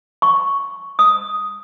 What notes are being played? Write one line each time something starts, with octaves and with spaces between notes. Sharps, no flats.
C#6
D#6